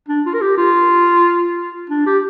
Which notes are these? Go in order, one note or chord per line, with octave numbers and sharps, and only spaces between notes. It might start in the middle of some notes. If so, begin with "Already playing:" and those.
D4
F4
A#4
G4
F4
D4
G4